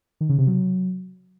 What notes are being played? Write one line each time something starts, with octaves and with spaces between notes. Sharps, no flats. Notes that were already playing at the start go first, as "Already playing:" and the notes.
D#3
C#3
C3
F#3